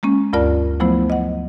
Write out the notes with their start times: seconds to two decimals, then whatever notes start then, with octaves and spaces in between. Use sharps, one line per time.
0.03 G#3 A#3 C#4
0.33 D2 G2 F4 A#4 D5 A5
0.80 F3 F#3 A3 B3 E4 C5
1.10 D#5 F#5